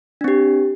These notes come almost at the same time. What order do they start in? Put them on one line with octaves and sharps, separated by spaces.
D4 C4 G4